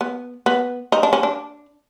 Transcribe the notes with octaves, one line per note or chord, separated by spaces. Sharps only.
B3
B3
D#4
D4
C#4
D4